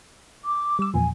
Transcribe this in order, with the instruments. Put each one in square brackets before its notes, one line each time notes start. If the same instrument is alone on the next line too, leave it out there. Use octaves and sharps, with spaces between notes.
[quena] D6
[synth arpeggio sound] G3 E6
[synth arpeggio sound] E2 A#2 F3 [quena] G#5